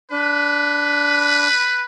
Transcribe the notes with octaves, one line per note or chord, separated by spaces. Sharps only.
D4 B4